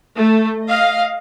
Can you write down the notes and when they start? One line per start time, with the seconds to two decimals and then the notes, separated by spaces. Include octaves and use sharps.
0.16 A3
0.67 D#5 F5